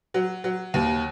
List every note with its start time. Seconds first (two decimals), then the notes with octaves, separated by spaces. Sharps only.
0.14 F#3
0.44 F#3
0.74 D#2